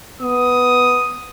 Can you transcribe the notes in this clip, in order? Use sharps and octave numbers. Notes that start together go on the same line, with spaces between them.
B3 D#6